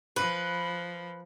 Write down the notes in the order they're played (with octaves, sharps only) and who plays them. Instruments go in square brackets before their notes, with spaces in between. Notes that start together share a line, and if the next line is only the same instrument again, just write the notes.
[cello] F3 [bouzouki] B4